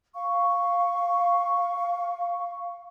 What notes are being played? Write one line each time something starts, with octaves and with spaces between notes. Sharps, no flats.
F5 C#6